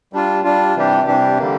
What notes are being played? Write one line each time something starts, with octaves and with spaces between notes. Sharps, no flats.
G3 D4 F4
G3 D4 F4
C3 E3 G3 D4 G4
C3 E3 G3 D4 G4
D3 G3 A#3